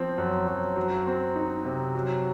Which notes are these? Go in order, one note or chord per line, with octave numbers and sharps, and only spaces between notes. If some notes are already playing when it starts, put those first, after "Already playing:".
Already playing: F3 C4
F#2
F#2
F#3
C4
D#4
C3
F#3